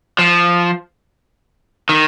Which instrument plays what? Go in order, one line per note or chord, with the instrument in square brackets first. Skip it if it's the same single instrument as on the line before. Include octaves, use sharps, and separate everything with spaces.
[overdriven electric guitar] F3
D#3